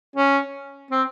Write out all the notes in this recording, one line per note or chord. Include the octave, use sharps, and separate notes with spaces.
C#4
C4